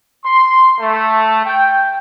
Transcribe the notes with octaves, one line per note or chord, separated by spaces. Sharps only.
C6
A3
G5